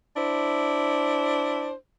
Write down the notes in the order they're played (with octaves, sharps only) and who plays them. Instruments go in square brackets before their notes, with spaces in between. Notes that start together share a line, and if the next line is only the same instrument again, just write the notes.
[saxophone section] D4 E4 C5